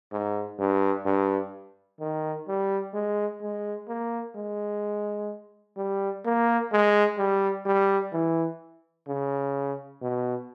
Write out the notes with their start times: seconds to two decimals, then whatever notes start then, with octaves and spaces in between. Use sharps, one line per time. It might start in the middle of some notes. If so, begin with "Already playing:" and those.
0.12 G#2
0.59 G2
1.05 G2
2.00 D#3
2.48 G3
2.94 G#3
3.42 G#3
3.88 A#3
4.36 G#3
5.77 G3
6.25 A#3
6.72 G#3
7.19 G3
7.66 G3
8.13 E3
9.08 C#3
10.02 B2